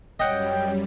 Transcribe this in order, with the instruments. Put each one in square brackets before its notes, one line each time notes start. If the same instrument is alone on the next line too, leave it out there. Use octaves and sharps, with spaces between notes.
[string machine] F#2 G3 [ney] C#5 [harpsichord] D#5 F#5 [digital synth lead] G5